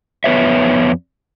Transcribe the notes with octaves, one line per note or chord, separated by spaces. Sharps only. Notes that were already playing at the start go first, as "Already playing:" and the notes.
F2 B3 B4 C#5 E5